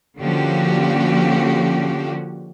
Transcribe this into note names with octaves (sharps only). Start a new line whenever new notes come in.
D3 F3 A#3 C#4 F#4 G4